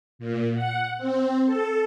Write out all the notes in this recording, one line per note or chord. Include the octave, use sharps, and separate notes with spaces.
A#2
F#5
C4
A4